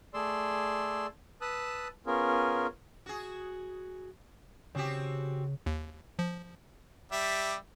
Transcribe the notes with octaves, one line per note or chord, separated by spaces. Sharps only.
A3 G#4 D5 C6 E6
B4 A5 D#6 E6 F#6
B3 C#4 F4 G#4 A#4
F#4 G#4
C#3 C4 F#4 G4
D#2
F3
G3 E5 D6